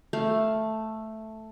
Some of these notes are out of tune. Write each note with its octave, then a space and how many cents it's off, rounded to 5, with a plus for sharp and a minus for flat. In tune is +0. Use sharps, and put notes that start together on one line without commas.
A3 +0 F5 +0